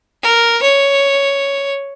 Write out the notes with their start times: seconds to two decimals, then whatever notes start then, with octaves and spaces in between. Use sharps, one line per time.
0.23 A#4
0.63 C#5